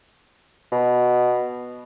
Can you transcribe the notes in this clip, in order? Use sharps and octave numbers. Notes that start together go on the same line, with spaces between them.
B2